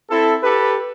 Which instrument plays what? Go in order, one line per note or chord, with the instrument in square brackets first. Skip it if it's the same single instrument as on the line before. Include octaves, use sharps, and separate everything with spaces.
[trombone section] C4 E4 A4
G4 A4 B4